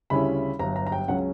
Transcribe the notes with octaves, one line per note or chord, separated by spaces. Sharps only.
D2 C#3 G3 C#4 E4 B5
G1 G2 F#3 A#5
A#5
A#5
G5
C#2 C#3 F#3 C#4 F#5